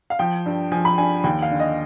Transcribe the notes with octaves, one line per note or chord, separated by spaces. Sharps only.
F5
F3 G5
G2
F3 G#5
B5
G2 G#5
D#2 G5
F5
D3
D#5